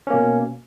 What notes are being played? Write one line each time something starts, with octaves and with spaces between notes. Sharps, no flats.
B2 A#3 C#4